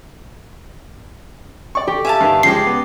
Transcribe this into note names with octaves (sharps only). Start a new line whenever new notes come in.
D5 C#6
G4
E5 F5 G#5 A5
G2 D#3
C#3 F3 G#3 D5 G5 C7
B3